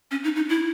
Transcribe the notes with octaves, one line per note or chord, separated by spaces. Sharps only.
C#4
D#4
D#4
E4